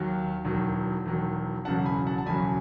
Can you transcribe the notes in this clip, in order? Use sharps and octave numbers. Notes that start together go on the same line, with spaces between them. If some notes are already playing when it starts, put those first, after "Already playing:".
Already playing: D#2 D#3 F#3
E1 E2 D#3 F#3
E1 E2 D#3 F#3
E1 E2 C#3 F#3 F#5 A5
G#5 B5
F#5 A5
A5
E1 E2 C#3 F#3 G#5 B5